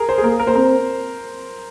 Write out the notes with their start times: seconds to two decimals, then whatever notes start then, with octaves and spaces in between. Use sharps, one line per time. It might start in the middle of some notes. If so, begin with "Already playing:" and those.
Already playing: G#4 A#4
0.09 C5
0.18 G#4
0.24 A#3 A#4
0.40 A#4
0.47 C5
0.55 C4 A#4